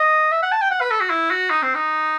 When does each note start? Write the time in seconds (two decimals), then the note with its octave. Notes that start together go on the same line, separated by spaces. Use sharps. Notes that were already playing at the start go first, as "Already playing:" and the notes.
Already playing: D#5
0.32 E5
0.43 F#5
0.52 A5
0.62 G5
0.71 F#5
0.81 B4
0.91 A4
1.01 F#4
1.10 E4
1.31 F#4
1.50 D#4
1.62 C4
1.75 D#4